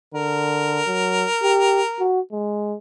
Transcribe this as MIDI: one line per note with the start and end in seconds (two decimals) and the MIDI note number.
0.14 0.81 50
0.14 2.09 70
0.87 1.25 54
1.42 1.82 67
2.00 2.20 66
2.32 2.77 56